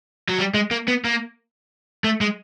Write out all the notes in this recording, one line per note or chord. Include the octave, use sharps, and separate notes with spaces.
F#3
G3
G#3
A#3
B3
A#3
A3
G#3